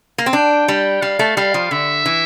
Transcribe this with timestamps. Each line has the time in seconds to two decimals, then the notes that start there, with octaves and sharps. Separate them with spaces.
0.18 A#3
0.26 C4
0.33 D4 G5
0.68 G3
1.02 G3 F5
1.19 A3
1.36 G3 F5
1.54 F3
1.71 D3 E5
2.06 E3